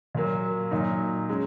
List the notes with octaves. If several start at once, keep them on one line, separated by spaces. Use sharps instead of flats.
A#2 F#3 A#3
A#2 F#3 D#4
G#3 C#4